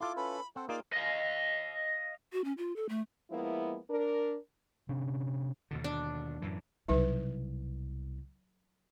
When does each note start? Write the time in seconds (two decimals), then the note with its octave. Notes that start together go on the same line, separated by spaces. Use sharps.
0.01 E4 F4 A4 C6 D6
0.17 C#4 A4 B4 B5
0.56 C4 A4 C5 F#5
0.69 A#3 D#4 F4 G#4 D5 F5
0.93 D#5 F5
2.33 F#4
2.44 C#4
2.58 F4
2.76 A4
2.89 A3
3.31 F3 G#3 A#3 B3 E4
3.90 D4 A#4
4.89 C3 C#4 D4
5.71 D#2 B2 D3
5.84 D4
6.42 F#2 A2 E3
6.88 C2 B2 F#3 D#4 B4